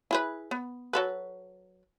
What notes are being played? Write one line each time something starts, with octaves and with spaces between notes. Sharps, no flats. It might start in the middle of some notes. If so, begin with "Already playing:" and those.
E4 G#4 B4
B3
F#3 A4 B4